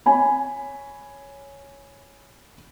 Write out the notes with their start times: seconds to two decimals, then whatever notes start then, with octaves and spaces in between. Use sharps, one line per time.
0.06 C#5 G#5 B5